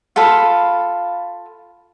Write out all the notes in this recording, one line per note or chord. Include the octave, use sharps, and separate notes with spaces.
F4 A4 F5 B5